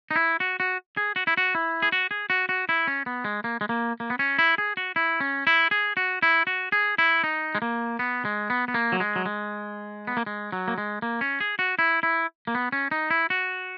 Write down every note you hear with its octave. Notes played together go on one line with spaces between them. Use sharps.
D#4
E4
F#4
F#4
G#4
F#4
E4
F#4
E4
G#4
F#4
G#4
F#4
F#4
E4
C#4
B3
G#3
A#3
G#3
A#3
A#3
B3
C#4
E4
G#4
F#4
E4
C#4
E4
G#4
F#4
E4
F#4
G#4
E4
D#4
G#3
A#3
B3
G#3
B3
B3
A#3
F#3
G#3
F#3
G#3
B3
A#3
G#3
F#3
A#3
G#3
A#3
C#4
G#4
F#4
E4
E4
A#3
B3
C#4
D#4
E4
F#4